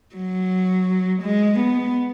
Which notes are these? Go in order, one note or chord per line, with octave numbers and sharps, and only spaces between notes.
F#3
G#3
B3